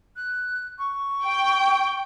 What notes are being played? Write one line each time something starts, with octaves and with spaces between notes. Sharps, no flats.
F#6
C#6
G5